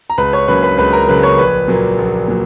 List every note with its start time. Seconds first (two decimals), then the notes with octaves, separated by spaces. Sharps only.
0.10 A#5
0.18 C#2 B4 B5
0.33 C#5 C#6
0.48 C#3 F#3 A#3 B4 B5
0.63 B4 B5
0.78 C#2 B4 B5
0.93 A#4 A#5
1.08 C#3 F#3 A#3 B4 B5
1.23 C#5 C#6
1.38 A#1 B4 B5
1.68 A#2 F#3 A#3
1.98 A#1
2.28 A#2 F#3